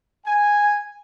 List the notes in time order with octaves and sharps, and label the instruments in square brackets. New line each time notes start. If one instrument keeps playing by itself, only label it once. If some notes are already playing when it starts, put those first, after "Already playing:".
[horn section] G#5